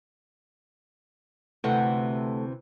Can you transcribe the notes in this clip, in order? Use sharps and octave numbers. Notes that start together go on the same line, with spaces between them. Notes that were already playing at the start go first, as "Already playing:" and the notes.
D2 C3 E3 A3 F#5